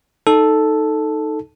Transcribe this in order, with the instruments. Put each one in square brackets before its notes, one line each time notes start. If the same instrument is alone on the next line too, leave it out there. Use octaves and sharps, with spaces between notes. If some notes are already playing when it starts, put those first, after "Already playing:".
[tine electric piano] D#4 A4